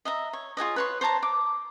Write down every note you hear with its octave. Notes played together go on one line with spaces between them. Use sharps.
D#5 E5 A#5
C#5
F4 G#4 C#5 D#5
B4 C#5 C6
C5 C#5 A5 A#5
D6